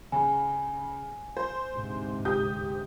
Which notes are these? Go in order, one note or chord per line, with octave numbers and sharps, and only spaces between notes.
C#3 G#5
C5
D2 G#2 C3
G4 D#6 G6